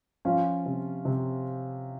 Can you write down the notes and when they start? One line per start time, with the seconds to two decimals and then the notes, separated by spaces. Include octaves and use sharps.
0.25 F3 C#4 F4
0.66 C3
1.05 C3